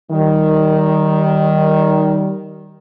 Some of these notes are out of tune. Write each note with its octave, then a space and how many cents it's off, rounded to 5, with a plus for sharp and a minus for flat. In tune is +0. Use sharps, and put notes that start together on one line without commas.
D#3 +0 G3 -25